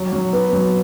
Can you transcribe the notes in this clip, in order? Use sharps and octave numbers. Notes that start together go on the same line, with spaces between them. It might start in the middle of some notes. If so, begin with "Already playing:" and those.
Already playing: F#3
F#3
B3
F#3